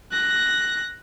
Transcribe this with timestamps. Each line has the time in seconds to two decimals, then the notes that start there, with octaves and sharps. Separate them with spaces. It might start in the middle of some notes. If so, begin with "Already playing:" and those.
0.11 F#6 A#6